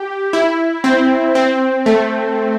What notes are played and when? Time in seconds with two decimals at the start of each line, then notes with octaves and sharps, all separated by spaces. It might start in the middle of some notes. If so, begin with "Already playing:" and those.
Already playing: G4
0.33 E4
0.84 C4
1.35 C4
1.86 A3